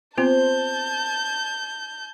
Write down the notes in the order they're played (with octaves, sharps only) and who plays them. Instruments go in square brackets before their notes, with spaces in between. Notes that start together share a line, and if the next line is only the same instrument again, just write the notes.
[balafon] B3 C4 F4 [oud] C5 [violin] A5 G6